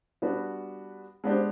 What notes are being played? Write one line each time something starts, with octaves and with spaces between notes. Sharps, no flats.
G3 B3 D4 F#4 B4
G#3 B3 D4 G4 C5